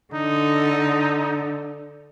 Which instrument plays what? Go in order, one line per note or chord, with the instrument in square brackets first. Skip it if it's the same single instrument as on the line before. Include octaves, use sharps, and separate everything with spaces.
[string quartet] D3 [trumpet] D#4